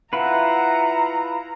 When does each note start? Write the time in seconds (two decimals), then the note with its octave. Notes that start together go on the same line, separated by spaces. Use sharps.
0.13 E4 F4 B4 E5 F#5 A#5